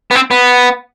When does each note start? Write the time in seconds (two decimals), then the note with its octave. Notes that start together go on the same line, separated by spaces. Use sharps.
0.11 B3
0.15 C4
0.31 B3